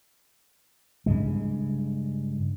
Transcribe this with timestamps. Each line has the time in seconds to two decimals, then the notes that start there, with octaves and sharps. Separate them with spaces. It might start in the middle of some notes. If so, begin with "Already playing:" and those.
1.06 G2 C#3 G#3